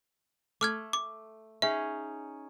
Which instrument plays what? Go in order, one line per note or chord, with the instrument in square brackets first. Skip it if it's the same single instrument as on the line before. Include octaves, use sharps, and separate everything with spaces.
[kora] A3 [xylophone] D6 F6 G#6
[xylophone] D6
[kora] C#4 D#4 G#4 [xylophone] E5